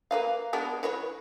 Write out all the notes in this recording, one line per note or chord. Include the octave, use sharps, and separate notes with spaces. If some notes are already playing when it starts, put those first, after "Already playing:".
A#3 B4 F5
G#3 B3 D4
E3 B4 C#5